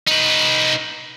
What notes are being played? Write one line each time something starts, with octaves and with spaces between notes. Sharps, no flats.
D#4 B4